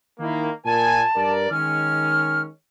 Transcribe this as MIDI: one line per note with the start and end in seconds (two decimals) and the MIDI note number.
0.19 0.51 51
0.19 0.51 58
0.19 0.49 64
0.65 1.01 46
0.65 1.01 70
0.65 1.01 80
0.65 1.33 81
1.15 1.51 43
1.15 1.51 70
1.15 1.51 74
1.51 2.47 51
1.51 2.47 56
1.51 2.47 61
1.51 2.42 89